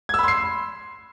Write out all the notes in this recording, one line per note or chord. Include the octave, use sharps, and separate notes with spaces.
B5 C6 E6 G#6 C7